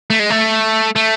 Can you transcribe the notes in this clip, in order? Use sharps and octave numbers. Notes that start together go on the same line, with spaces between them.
A3
G#3
A3
A3